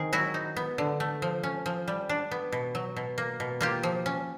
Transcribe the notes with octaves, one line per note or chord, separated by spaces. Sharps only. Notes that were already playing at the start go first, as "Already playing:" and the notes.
Already playing: D#3 C4 G#4
F#3 E4 F#4
D#4
B3
D3
A3
F3
C#4
F3
G3
D4
B3
B2
F#3
B2
A#3
B2
A#3 F4 G4
F3
C#4